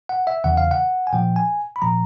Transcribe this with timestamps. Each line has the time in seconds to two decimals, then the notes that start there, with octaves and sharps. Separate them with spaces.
0.09 F#5
0.27 E5
0.44 E2 C#3 E3 F#5
0.57 F5
0.71 F#5
1.07 G#5
1.13 A#2 F3 G5
1.36 G#5
1.76 B5
1.82 A#2 F3 A#5